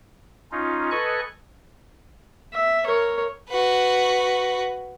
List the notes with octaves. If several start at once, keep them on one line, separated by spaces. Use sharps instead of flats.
C#4 D#4 F4
A4 B4 D#5 G#5 C#6 F#6
E5
A#4 C#5
F#4 B4